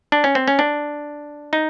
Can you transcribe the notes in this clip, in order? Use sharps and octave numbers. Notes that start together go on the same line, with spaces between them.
D4
C#4
C4
C#4
D4
D#4